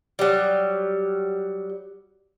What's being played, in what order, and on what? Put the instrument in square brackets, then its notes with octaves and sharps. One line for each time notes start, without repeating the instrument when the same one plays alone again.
[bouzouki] F#3 G3